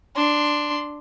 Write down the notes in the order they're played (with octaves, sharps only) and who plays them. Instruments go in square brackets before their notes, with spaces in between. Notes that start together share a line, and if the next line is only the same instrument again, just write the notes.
[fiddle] D4 C6